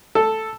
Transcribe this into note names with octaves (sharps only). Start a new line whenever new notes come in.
A4